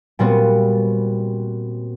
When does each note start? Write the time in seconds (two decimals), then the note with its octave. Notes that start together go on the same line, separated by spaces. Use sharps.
0.19 A#2 G3 B3 C4 F#4